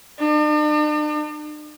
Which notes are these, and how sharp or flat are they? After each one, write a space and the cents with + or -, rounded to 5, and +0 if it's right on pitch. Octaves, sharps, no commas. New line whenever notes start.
D4 +45